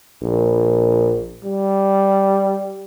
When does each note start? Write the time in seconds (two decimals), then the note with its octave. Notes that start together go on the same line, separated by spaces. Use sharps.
0.22 A#1
1.44 G3